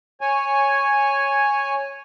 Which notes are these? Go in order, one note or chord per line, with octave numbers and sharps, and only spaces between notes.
C#5 G#5